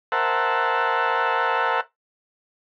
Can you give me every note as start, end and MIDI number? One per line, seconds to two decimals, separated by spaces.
0.12 1.81 70
0.12 1.81 72
0.12 1.81 76
0.12 1.81 78
0.12 1.81 81